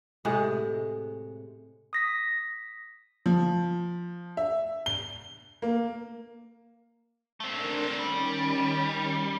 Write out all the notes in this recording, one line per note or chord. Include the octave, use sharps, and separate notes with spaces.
A2 C3 G#3 F#5
D#6 A#6 B6
F3
E5
G7
A#3
A3 C4 D4 A#4
D#3 G3 C#4